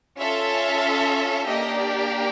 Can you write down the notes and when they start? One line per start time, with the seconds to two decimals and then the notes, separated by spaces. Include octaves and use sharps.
0.18 C#4 F4 A4 E5
1.46 A#3 D4 G4 D#5
1.78 D5